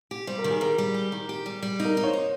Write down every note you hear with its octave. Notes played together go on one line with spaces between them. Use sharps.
G4
G3 C5
A#4
D#3
G#4
G3 A#4
G3
G4
D#3
G4
G3
G3
D#4
A#4
D#4
C#5
C5
D#4